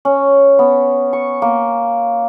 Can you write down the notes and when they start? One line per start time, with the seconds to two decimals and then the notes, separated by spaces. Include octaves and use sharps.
0.05 C#4
0.59 B3
1.13 C#6
1.42 A#3